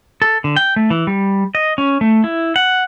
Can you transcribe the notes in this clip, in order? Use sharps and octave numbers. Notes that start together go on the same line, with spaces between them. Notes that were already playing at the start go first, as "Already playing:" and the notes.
A4
D3
G5
A3
E3
G3
D#5
C#4
A3
E4
F#5